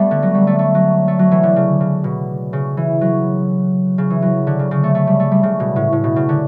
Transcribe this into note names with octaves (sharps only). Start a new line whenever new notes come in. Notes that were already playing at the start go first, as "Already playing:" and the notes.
Already playing: G3 A3 B3
D3
F#3
G3
A3
A3
F#3
A3
F#3
E3
D3
C#3
C#3
B2
C#3
E3
F#3
C#3
E3
F#3
D3
C#3
C#3
A3
A3
G3
A3
G3
C#3
B2
A2
A2
B2
C#3
D3